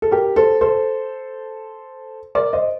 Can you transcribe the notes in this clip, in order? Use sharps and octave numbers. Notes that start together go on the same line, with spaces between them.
A4
G4 A#4
A4 C5
A4 C5
A#4 D5
C5 D#5